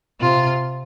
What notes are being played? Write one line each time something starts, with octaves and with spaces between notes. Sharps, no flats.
C3 F4